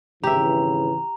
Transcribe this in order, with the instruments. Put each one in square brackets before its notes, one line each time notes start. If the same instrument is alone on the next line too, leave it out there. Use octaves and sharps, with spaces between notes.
[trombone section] G#1 C#3 E3 [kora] G4 E5 [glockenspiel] A#5